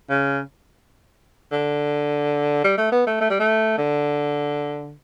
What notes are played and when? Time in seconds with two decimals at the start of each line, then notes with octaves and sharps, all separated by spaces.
0.10 C#3
1.52 D3
2.64 G3
2.78 A3
2.92 B3
3.07 A3
3.21 A3
3.30 G3
3.40 A3
3.78 D3